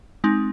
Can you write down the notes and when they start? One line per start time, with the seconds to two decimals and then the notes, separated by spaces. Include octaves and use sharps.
0.24 G#3 C4 D#4